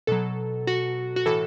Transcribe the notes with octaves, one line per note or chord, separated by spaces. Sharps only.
B2 F#3 A4
F#4
F#4
A2 E3 A4